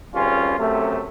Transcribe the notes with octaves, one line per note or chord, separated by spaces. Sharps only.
G#1 C#2 G3 C#4 F4
F#2 C3 A3